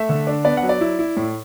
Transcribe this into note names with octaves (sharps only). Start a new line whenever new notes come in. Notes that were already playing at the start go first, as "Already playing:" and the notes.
Already playing: A3 E5
D3
D4
B3 D5
F#5
F#3
D5
E4
E4
A2